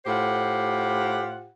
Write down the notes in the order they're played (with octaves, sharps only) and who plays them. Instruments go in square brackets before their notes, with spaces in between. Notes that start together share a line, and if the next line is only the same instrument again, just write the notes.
[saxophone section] A2 F4 G4 C5 F#5